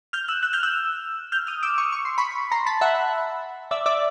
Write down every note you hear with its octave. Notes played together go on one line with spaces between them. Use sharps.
F6 G6
E6 F#6
E6 F#6
F6 G6
E6 F#6
F6 G6
D#6 F6
D6 E6
C#6 D#6
C#6
C6
B5 C#6
A#5 C6
A5 B5
E5 F#5
D5 E5
D5 E5